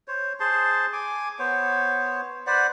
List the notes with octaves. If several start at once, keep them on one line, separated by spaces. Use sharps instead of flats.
C5 C#5
G#4 C5 A5 C6
G#5 D6
B3 C5 C#5
B4 C5 D5 F#5